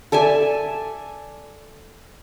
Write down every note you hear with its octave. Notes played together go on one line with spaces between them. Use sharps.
A4 D5 E5 G#5